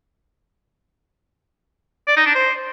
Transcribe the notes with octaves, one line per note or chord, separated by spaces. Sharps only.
D5
D#4
D4
C5